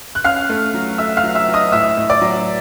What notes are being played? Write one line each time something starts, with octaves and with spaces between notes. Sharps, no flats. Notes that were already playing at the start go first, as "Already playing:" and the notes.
F#6
C#4 F5 F6
A3
F#3
A3 E5 E6
F5 F6
F#3
E5 E6
F#3
D#5 D#6
A2 E5 E6
A2
D5 D6
F#3